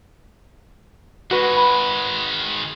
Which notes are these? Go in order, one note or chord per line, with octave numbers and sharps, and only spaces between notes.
D#3 G#3 F#4 B4
B5